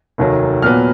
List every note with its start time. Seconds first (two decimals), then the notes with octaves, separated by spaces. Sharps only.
0.18 F1 D#2 D#3 F#3
0.62 A#2 F#3 B3 F6